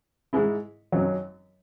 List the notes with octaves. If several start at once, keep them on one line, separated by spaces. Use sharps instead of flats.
G#2 G#3 E4
G#1 F#2 F#3